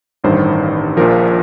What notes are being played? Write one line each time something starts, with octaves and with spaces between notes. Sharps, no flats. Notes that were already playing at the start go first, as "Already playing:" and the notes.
A1 G2 D#3 C5
A#1 A#2 F3 A#4